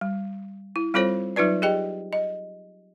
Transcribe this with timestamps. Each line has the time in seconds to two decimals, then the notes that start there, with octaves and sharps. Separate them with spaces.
0.01 G3
0.76 E4
0.94 G3 C4 F4 A4 C5 C#5
1.36 F#3 D#4 F4 B4 D5
1.62 G4 G#4 D#5 G5
2.13 D#5